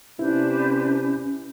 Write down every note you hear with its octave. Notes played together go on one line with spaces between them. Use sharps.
C3 C#4 D4 E4 B4 G6